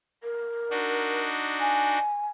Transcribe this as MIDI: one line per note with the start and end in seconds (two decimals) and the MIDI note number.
0.23 1.23 70
0.71 1.99 62
0.71 1.99 63
0.71 1.99 66
1.60 2.27 80